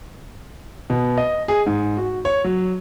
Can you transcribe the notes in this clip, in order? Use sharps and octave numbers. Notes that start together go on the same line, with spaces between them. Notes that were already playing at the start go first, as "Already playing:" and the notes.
B2
D#5
G#4
G#2
F#4
C#5
F#3